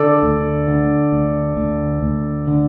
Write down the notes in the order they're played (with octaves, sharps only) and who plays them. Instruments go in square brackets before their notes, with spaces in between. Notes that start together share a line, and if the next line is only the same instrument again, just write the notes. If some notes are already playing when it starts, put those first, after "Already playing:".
Already playing: [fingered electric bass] D3 [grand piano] A4 D5
[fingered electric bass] D2
D3
D2
D2
D2
D3